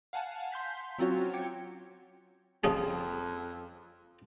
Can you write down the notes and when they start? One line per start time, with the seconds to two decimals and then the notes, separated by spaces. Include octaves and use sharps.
0.13 F5 F#5 G#5 A5
0.52 C6 G6 B6
0.98 F#3 C4 C#4 F4 F#4 C#5
1.33 G5 D6 G#6 C#7
2.64 F2 F3 C#4 G#4